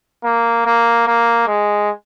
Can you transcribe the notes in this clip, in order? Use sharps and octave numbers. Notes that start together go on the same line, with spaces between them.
A#3
A#3
A#3
G#3